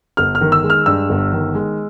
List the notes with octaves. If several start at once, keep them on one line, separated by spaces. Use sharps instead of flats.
G1 F6
F6
D#3
E6
G#3
F6
G2 E6
G1
D#3
G#3